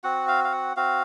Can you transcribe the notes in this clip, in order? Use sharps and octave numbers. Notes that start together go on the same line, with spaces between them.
C4 F#4 F#5
F5
F5
F#5
C4 F#4 F5